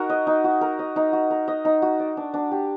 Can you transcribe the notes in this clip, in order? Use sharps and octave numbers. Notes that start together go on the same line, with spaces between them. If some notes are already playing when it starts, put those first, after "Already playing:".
Already playing: D#4 F#4 A#4
D#5
D#4
F#4
A#4
D#5
D#4
F#4
A#4
D#5
D#4
F#4
D5
D4
D4
G4